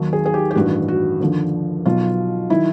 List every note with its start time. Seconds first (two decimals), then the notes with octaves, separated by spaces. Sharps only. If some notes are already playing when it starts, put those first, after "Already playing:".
Already playing: D#2 D#3 F#3
0.13 G#4
0.26 G#4
0.34 G4
0.51 G4
0.55 A1 G2 D#3 F#4
0.88 F#4
1.21 D#2 D3 F3
1.85 B1 B2 F#3 F4
2.50 D#3 F#3 E4